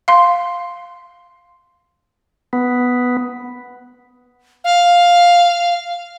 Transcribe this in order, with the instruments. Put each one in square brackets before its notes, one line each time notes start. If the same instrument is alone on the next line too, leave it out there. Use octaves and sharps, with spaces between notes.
[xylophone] F5 C6
[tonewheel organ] B3
[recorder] F5